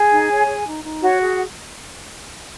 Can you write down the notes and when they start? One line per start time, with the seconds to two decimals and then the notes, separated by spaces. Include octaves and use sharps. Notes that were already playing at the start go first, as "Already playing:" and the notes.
Already playing: G#4 G#5
0.11 D#4
0.30 C#5
0.48 G#4
0.66 D#4
0.84 D#4
1.02 F#4 C#5 F#5
1.20 G#4